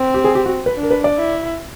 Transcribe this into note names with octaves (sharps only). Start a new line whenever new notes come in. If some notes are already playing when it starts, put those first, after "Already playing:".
Already playing: C4
G4
G#4
G4
F#4
B4
D4
A#4
B4
D5
E4